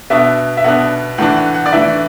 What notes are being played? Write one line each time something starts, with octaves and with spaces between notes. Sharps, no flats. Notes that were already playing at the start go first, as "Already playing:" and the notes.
B2 B3 D4 E5
E5
B2 B3 D4 F#5
A2 E3 D4 F#5
F#5
F#5
D5
A2 E3 D4 E5